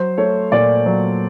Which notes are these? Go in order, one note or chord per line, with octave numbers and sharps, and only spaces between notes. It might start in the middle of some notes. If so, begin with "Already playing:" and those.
Already playing: F#3 C5
A3 C#5
A#2 D5
F#3